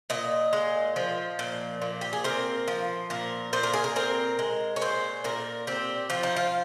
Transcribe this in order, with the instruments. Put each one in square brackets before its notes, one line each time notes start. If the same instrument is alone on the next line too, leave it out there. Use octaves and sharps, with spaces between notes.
[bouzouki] A#2 D#5
G#3
F3
A#2
A#2
G4
G#4
C4 A#4
F3
A#2 A#4
A#2 C5
A#4
G#4
A#4
C4 A#4
G#3
C#5
A#2 C5
A#2 A#4
C4 G4
F3 F4
D#4
F4